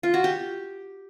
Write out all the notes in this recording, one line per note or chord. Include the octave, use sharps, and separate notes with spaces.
F4
F#4
G4